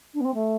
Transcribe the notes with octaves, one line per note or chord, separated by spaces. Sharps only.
D4
B3
C4
A3